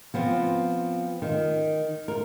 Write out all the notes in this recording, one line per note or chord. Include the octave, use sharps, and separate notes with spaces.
F3 B3 C4
D#3
A#4